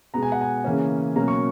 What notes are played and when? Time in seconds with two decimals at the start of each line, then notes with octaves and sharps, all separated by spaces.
0.14 B2 G#3 B3 A#5
0.23 G#5
0.32 F#5
0.41 G#5
0.64 C#3 E3 A#3 C#4
1.16 B2 F#3 A#3 C#4 A#5
1.28 C#6